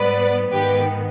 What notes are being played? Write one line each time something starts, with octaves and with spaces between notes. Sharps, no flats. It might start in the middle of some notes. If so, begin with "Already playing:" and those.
Already playing: G#2 G3 B3 B4 D5
G#2 D#3 B3 G4 B4